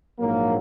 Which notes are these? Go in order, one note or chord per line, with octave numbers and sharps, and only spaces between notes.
A#1 G#2 F#3 A#3